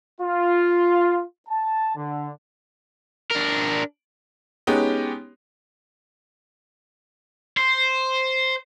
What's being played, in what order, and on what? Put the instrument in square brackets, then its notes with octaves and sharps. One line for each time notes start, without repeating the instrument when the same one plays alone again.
[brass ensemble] F4
A5
D3
[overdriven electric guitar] D4 A#4
[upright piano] G#3 B3 C#4 D#4 G4
[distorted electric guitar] C5